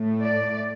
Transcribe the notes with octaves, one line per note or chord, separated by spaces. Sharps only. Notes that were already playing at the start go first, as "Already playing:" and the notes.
Already playing: A2 A3
D5